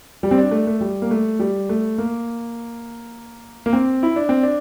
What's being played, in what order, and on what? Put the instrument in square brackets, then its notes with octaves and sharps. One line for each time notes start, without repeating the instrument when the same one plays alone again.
[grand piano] G3
C4
D4
A3
A3
G3
A#3
A3
G3
A3
A#3
A#3
C4
E4
D4
C4
D4